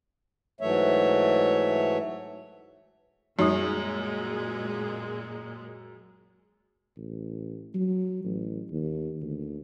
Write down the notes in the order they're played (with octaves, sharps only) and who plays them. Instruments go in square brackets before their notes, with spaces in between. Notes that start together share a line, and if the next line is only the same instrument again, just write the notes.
[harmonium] G#2 E3 F#3 A3 C#5 E5
[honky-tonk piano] F#2 [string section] A#2 G#3 [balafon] G3 D#4
[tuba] A1
F#3
A1
D#2
D2